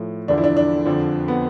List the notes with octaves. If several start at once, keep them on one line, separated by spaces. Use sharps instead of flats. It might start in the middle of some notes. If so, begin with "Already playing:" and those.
Already playing: A2 F3
E2 D3 F3 D4
E4
D4
D4
F2 D3 F3
B3